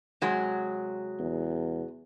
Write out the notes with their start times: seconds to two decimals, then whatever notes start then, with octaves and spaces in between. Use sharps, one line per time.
0.21 C3 F#3 G#3
1.19 E2